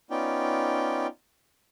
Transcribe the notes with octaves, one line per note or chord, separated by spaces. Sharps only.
B3 C#4 D#4 F4 D5 G5